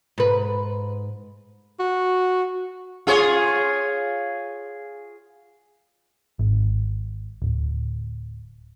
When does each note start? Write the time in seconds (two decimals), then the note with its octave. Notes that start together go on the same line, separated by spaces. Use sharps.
0.18 G#2 B4
1.80 F#4
3.07 F4 G#4 C#5
6.39 G#1
7.42 D1